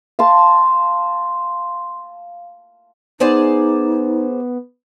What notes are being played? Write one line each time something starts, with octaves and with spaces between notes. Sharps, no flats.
F5 A5 C6
B3 D#4 G#4 C5 D5